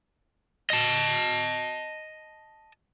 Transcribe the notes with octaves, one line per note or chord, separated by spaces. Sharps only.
D#5 A5